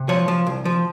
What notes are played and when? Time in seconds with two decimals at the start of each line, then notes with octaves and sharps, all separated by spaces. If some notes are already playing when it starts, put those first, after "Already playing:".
Already playing: C3
0.09 F3 C#5
0.28 F3
0.47 C2
0.65 F3